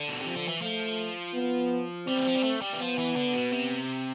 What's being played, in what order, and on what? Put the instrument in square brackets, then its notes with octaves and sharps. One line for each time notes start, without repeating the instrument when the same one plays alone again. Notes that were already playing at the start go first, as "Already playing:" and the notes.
Already playing: [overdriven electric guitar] D3
B2
C3
[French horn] F3
[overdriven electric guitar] D3
E3
[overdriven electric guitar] F3 [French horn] A3
[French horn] B3
[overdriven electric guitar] G3 [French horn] C4
[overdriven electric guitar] E3
F3
G3
A3
G3
E3
[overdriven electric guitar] F3 [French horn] B3
[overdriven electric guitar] E3
D3
B2
C3